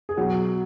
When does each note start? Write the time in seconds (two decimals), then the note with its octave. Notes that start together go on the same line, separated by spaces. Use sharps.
0.09 G#4
0.17 B2 F#3 F#4